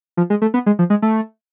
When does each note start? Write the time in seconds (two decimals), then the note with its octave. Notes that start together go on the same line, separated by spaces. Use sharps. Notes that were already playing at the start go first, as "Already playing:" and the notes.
0.17 F3
0.30 G#3
0.42 A3
0.54 B3
0.66 G#3
0.79 F3
0.90 G#3
1.02 A3